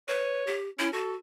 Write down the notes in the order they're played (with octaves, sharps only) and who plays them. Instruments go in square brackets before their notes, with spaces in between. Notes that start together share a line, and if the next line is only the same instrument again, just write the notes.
[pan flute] B4 [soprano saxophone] C#5
[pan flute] G4
[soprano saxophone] C#4 [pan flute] E4
[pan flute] F#4 [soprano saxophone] A4